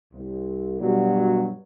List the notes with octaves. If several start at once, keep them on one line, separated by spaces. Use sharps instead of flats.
C2
G2 B2 F#3 G3